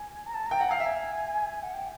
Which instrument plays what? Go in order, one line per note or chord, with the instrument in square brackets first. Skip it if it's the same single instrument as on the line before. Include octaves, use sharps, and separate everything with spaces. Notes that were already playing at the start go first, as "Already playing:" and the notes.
Already playing: [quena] G#5
A#5
A5
A#5
[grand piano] G5
[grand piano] F#5 [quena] A#5
[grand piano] F5 [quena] G#5
[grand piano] E5
[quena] F#5
G5